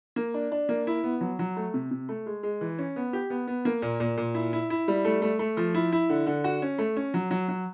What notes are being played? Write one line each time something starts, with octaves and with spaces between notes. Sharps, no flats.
A#3
D4
D4
A#3
E4
B3
F#3
F#3
A3
C3
C3
A3
G#3
G#3
E3
C#4
B3
G4
B3
B3
A#3
A#2
A#2
A#2
E4
E4
E4
G3
A3
A3
A3
F3
E4
E4
D3
D3
F#4
C#4
A3
C#4
F#3
F#3
F#3